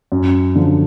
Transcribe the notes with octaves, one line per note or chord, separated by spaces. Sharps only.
F#2
D3 F3